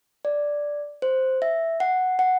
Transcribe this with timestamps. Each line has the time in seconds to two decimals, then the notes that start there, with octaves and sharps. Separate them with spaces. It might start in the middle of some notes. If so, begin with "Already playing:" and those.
0.25 D5
1.02 C5
1.42 E5
1.80 F#5
2.19 F#5